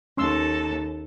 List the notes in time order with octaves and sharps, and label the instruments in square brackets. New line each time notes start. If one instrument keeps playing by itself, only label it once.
[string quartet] D#2 A4 [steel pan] C#4 C6 E6